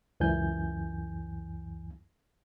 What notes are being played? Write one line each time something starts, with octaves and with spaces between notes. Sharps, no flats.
C#2 F#2 E3 G#5 G6